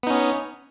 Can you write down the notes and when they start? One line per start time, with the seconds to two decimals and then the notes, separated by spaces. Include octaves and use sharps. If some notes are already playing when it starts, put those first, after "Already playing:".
0.03 B3
0.07 D#4
0.10 C#4